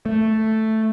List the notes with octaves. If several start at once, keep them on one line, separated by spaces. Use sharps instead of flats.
A3